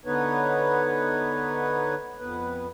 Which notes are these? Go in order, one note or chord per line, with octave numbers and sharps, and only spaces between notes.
D3 B3 D#4 B4 C#5
F2 B3 B4